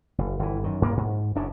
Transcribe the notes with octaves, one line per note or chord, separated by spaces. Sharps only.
F#1
G1 E3
F#2 D#3
G2 A#3 B3
G#2
F#1 F#2 C#3 D4